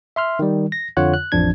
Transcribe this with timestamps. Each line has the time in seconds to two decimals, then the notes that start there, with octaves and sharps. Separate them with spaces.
0.16 E5 C6 F6
0.39 D#3 G3
0.72 A#6
0.97 F2 D3 F4 C#5 F#5 F#6
1.14 F#6
1.32 A1 F2 F3 D4 G#6